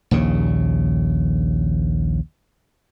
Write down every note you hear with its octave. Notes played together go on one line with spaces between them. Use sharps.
A#1 D#2 C#3